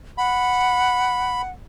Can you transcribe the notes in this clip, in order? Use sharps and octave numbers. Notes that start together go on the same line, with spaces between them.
F#5 B5